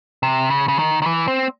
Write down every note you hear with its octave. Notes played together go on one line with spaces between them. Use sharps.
C3
C#3
C#3
D#3
D#3
E3
C4